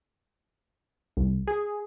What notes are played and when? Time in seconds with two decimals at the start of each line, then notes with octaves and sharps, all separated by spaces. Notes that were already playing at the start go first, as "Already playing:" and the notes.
1.17 C2
1.47 G#4